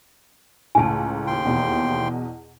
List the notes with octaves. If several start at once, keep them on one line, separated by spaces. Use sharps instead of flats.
C#2 A2 G#5 A5
D#2 G5 C6
E2 B2